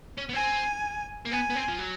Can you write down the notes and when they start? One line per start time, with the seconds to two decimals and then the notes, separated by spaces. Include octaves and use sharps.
0.18 C#4
0.29 B3
0.33 C4 G#5
1.25 A#3
1.31 B3 G#5
1.50 B3
1.55 C4
1.68 F3
1.79 F#3